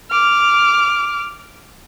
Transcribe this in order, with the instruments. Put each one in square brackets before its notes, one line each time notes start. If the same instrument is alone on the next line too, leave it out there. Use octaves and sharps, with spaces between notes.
[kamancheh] D6 F6